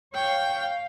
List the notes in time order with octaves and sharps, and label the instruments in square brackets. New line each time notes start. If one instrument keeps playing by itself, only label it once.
[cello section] C#5 F5 [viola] G5
[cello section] F5